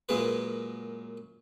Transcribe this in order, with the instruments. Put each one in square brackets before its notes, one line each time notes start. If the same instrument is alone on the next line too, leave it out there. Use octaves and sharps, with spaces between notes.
[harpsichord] F#2 A#2 G#3 G#4 B4